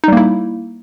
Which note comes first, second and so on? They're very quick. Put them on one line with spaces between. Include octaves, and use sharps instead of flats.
D#4 G3 A#3 E4